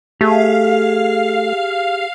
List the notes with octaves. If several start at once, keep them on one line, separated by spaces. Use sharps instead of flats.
A3 G4 G#4 F5